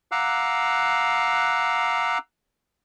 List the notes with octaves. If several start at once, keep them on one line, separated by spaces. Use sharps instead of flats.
F5 F#5 A#5 D6 E6 F#6